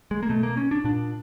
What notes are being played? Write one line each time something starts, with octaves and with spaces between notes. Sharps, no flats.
G#3
A#3
B2 A3
A#3
C#4
D4
A#2 D4